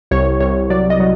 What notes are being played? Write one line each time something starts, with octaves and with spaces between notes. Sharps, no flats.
C2 C#5
C2 C#5
F#3 D5
D#5
F#3